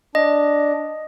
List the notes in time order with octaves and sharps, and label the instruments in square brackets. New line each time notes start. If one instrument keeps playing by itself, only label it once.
[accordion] D4 [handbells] D#5